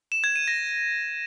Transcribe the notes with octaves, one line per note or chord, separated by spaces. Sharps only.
E7
G#6
D#7
A#6